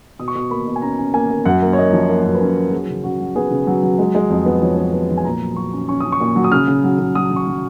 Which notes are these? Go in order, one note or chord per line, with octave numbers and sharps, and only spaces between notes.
B2 D#6
C#6
B2 D#6
A#3 B5
B2
G#5
C#4 A#5
C#4
A#3 G#5
A#3
F#2 F#5
A#3
C#5
A#3 D#5
F3
A#3
F#2
B4
C#4 A#4
C#4
F#3 G#4
C#3
C#3 F#4
F#3
B3 G#4
C#3
F#3
F#3
G#3
G#3
F2
B3
F3 C#5
B3
B3
F3
G#5
A#2 A#5
F#3
F#3 C#6
C#4
C#4 C#6
C#4 D#6
C#6
A#2
F#3
D#6
C#3 F6
C#3
F#3
C#3
F#3 D#6
C#3
C#6
F#3